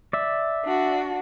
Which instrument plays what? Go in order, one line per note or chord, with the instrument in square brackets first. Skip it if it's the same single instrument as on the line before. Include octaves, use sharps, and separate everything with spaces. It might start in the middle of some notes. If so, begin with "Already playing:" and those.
[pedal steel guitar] D5 E5
[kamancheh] D4 F#4